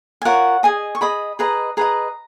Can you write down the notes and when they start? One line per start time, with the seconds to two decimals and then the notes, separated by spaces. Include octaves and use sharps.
0.22 G#5
0.25 F4 A#4 C#5 F#5
0.63 G#4 D#5 G#5
0.95 C#6
1.01 G#4 D#5 B5
1.39 G#4 B4 D#5 A#5
1.77 G#4 B4 D#5 A#5